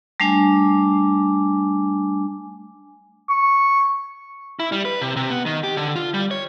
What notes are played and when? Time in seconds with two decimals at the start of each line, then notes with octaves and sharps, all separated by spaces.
0.20 G3 A3 D4 G#5 D6
3.29 C#6
4.60 E4
4.72 G3
4.85 B4
5.02 C3
5.16 C3
5.30 B3
5.46 D#3
5.63 G4
5.77 D3
5.96 F4
6.14 G3
6.31 C#5